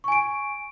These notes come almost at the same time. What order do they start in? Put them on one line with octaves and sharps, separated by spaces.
C#6 G#5 D7